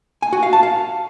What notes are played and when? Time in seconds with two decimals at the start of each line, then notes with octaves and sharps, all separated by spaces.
0.22 G#5
0.33 F#4
0.43 F5
0.53 A5
0.63 F5